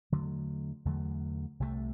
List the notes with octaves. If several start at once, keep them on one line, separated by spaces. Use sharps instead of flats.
E2 D3 F#3 A3
E2 D3 F#3 A3
C2 C3 E3 A3